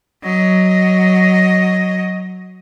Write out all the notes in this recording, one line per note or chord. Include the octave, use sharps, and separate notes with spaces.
F#3 D#5